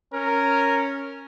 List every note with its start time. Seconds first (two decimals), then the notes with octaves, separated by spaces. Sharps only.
0.13 C#4 A#4